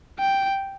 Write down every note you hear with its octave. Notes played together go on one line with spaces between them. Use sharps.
G5